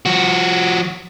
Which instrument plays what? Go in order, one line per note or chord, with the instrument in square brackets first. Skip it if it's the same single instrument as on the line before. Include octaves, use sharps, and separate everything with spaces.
[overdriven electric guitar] F3 F#4